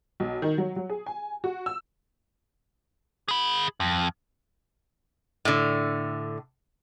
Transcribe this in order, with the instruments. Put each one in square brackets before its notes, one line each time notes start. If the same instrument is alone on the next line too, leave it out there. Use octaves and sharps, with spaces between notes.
[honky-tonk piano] B1
D#3
F#3
F#3
G#4
G#5
F#4
E6
[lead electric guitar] G#4 B5
F2
[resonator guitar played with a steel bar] A2 D3